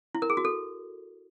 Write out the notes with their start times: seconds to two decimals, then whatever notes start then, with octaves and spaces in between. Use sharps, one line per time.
0.15 E4
0.22 A#4
0.30 G#4
0.37 F#4
0.45 A4